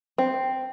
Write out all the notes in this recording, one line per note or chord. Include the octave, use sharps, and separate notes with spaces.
C4